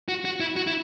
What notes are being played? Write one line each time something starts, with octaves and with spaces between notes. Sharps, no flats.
F#4
F#4
E4
F#4
E4